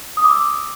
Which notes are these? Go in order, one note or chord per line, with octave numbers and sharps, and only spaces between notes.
D#6
D6
E6